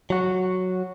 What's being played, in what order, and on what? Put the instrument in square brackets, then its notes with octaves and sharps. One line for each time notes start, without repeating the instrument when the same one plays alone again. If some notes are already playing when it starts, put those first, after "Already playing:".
[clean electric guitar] F#3 F#4